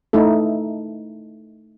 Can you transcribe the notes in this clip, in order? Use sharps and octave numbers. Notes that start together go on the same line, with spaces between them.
A3 D#4 E4 A4